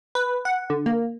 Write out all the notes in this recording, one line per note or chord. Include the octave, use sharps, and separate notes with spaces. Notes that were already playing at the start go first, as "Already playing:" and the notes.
B4
F#5
D3
A#3